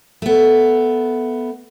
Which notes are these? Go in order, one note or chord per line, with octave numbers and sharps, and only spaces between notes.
A3 B3